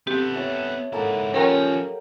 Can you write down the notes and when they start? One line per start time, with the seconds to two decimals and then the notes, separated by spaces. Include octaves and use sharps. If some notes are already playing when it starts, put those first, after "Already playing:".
0.07 B3 C4 G4 A4
0.33 C#5 E5 A5
0.93 G#2 A#3 E4 A4 F#5
1.34 F3 C#4 F#4 G4 A#4 G5 A#5